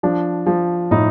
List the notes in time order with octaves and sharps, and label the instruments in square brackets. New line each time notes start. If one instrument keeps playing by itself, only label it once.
[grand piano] F3 D4
F3
A2 D#4